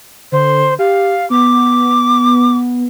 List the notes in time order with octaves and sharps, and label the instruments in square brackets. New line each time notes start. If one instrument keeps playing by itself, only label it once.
[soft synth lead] D3 [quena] C5
[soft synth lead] G4 [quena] F5
[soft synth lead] B3 [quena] D6